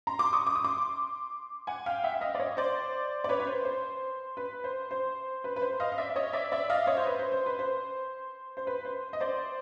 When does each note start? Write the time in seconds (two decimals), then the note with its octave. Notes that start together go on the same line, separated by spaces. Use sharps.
0.07 A#5 C6
0.19 C6 D6
0.33 C#6 D#6
0.47 D6
0.55 D#6
0.64 C6 D6
1.67 F#5 G#5
1.86 F5 G5
2.04 E5 F#5
2.14 E5
2.21 D#5 F5
2.35 D5
2.40 C#5 D#5
2.57 C5 D5
3.24 D5
3.29 B4 C#5
3.40 B4
3.46 C5
3.65 C5
4.37 B4
4.64 C5
4.91 C5
5.44 B4
5.56 B4
5.61 C5
5.80 D#5 F5
5.92 F5
5.98 D5 E5
6.10 E5
6.16 C#5 D#5
6.33 D5 E5
6.52 D5 E5
6.70 D#5 F5
6.87 C#5 D#5
6.97 C5
7.06 B4
7.19 C5
7.32 C5
7.46 B4
7.59 C5
8.57 C5
8.67 B4
8.85 C5
9.13 D#5
9.20 C5 D5